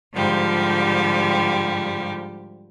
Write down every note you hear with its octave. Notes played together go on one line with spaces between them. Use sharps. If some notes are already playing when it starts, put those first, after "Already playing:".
G#2 D3 F3 G3 G4